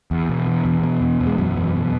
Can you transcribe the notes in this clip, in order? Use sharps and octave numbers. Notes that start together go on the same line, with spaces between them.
E2
B2
E2
E2
B2
E2
E2
G#3
F#2 B2 F#3
E2
B2